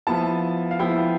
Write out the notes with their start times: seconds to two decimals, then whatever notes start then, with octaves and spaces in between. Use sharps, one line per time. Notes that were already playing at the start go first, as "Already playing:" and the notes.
0.07 F3 B3 E4 A5
0.71 F5
0.79 F3 B3 E4 G5